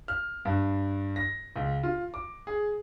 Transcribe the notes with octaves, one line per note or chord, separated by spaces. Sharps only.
F6
G2
A#6
C#2
F4
D6
G#4